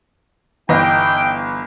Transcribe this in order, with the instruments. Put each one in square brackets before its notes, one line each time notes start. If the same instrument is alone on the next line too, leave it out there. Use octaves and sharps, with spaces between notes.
[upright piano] G1 E3 D#5 [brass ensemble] D#4 E4 G5